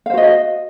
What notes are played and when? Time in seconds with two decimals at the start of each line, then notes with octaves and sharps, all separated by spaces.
0.06 F5
0.10 C5
0.14 F#4
0.17 D#5